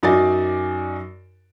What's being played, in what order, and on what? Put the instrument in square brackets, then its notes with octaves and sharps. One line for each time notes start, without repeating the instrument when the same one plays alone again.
[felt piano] F#2 D#4 F#4 D5 G#5 A6